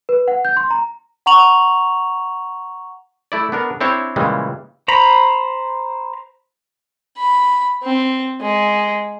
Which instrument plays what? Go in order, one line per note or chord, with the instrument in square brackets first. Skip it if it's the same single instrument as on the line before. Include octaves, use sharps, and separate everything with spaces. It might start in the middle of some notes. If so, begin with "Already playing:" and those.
[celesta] B4
F#5
G6
C6
A#5
F#5 A#5 C#6 F7 F#7
[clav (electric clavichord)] A3 E4 D5
B3 D4 A#4
C4 D4 E4 C5 C#5
A#2 C#3 E3 G3 G#3
[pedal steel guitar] C5 A#5 B5
[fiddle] B5
C4
G#3